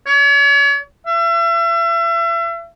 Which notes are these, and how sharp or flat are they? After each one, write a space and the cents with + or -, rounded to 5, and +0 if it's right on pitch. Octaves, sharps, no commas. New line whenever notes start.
C#5 +40
E5 +35